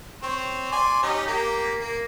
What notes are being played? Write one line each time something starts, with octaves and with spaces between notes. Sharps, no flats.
C4 C#5
D5 G#5 C6
C#4 D#4 G4
A#3 G4 A#5
A#3